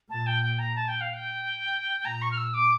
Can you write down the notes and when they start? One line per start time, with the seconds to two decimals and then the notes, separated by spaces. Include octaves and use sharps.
0.09 A#2 A5
0.27 G5
0.42 G5
0.59 A#5
0.76 A5
0.88 G5
1.01 F5
1.14 G5
2.05 A#2 A#5
2.22 C#6
2.31 F6
2.37 E6
2.54 D6